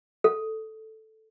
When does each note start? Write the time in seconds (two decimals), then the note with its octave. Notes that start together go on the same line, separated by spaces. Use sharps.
0.24 A4